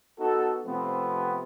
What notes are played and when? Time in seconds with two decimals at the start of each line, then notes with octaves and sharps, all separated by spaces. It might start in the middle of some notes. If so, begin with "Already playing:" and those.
0.19 B3 D#4 F#4 A4
0.66 C3 F3 A3 B3 C4